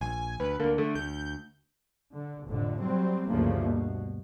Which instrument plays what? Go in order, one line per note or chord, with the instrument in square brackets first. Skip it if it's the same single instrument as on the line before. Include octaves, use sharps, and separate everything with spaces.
[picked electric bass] A#1 [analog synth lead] G#5
[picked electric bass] D2 [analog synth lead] B4
[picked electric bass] D2 D3 [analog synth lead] A#3
[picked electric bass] D3 [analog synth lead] A3
[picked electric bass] D2 [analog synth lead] G6
[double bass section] D3
F1 A2 D3
F#3 G3 C4
D2 G2 C#3 F3 A3 A#3
B2